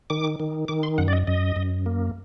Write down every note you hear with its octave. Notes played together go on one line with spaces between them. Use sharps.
D#3 D6
D#3
D#3 D6
C6
F#2 F#5
D5
D#5
F#2 D#5
F#2
A#3